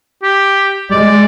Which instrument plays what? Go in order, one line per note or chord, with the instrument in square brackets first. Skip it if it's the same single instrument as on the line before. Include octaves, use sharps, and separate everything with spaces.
[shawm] G4
[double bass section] G#3 [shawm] D5